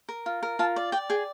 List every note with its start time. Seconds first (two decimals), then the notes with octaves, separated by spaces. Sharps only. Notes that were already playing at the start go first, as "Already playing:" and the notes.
0.09 A#4
0.26 F4
0.43 A#4
0.59 F4 A5
0.76 D5
0.92 D5 G5
1.10 G#4 G5